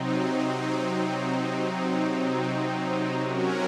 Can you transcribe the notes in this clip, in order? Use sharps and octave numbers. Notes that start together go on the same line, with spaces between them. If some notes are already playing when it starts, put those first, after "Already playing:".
Already playing: C3 F#3 C4 D#4
C3 F#3 C#4 F#4 A#4